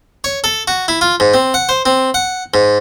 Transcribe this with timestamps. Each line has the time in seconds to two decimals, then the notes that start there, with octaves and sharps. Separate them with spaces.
0.24 C#5
0.44 A4
0.68 F#4
0.88 E4
1.01 F4
1.20 G#2
1.34 C4
1.54 F#5
1.69 C5
1.86 C4
2.14 F#5
2.54 G#2